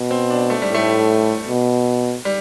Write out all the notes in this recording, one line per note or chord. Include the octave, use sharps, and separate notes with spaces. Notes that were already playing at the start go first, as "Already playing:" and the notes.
Already playing: B2
C4
D4
A3
G3
A2
A3
B2
G3